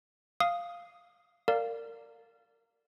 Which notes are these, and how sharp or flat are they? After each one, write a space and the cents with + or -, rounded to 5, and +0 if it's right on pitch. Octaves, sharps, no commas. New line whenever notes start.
F5 -5 D#6 +0
A#4 -25 D5 +0 F5 +0